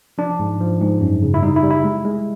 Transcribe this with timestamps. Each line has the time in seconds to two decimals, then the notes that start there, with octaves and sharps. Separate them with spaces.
0.18 F3 D4
0.39 G#2
0.60 F3
0.81 G#2
1.01 F#2
1.22 C#3
1.34 E4
1.43 G3 D#4
1.56 E4
1.63 G3
1.70 E4
1.84 G#3
2.05 G#3